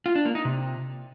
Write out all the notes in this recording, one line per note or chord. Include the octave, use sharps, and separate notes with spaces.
F4
D4
A#3
D#4
C3